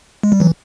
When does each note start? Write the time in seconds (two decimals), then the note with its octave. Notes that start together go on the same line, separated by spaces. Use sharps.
0.23 G#3
0.32 G3
0.40 E3 F#3